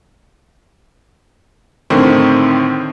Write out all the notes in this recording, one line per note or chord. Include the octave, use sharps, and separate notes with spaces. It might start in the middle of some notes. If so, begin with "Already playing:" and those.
A2 D3 D#3 C4